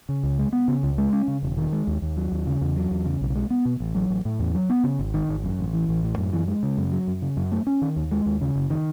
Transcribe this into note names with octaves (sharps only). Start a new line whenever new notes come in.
C#3
C#2
G#3
B3
C#3
C#2
G#3
C#4
C#3
E1
D#3
G#3
D#2
D#2
F#3
D#2
C#3
E2
F#3
E2
C#3
B1
G#3
B3
B2
A1
F#3
A1
A2
E2
F#3
B3
C#3
G#1
D#3
G#1
F#2
A1
E3
A1
A2
F#2
E3
G#3
C#3
F#2
F#3
F#2
C#3
F#2
A3
C#4
D#3
D#2
G#3
D#2
C#3
F#1
D#3